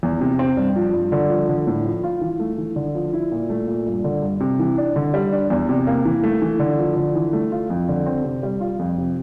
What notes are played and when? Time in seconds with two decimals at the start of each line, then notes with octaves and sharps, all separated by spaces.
0.03 E2
0.21 C3
0.39 C4
0.57 G2
0.76 F3
0.93 G2
1.12 D3
1.30 F3
1.49 D3
1.67 A2
1.85 F3
2.04 F4
2.21 E3
2.40 A3
2.58 E3
2.76 D3
2.95 F3
3.13 E4
3.32 A#2
3.50 A3
3.68 A#2
3.87 G2
4.04 D3
4.22 G2
4.40 C3
4.59 E3
4.78 D4
4.96 D3
5.14 G3
5.32 D4
5.50 E2
5.69 C3
5.87 A#3
6.05 E3
6.23 A3
6.42 E3
6.60 D3
6.79 F3
6.96 D3
7.15 E3
7.33 A3
7.52 F4
7.70 F2
7.88 D3
8.06 C4
8.24 C3
8.43 G3
8.61 F4
8.79 F2
8.98 C3